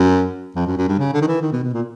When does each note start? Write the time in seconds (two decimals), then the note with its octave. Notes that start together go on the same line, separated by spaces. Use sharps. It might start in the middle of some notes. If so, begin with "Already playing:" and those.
Already playing: F#2
0.56 F2
0.67 F#2
0.77 F#2
0.88 G2
0.99 C#3
1.13 D3
1.22 D#3
1.27 E3
1.42 D#3
1.53 B2
1.63 B2
1.74 A#2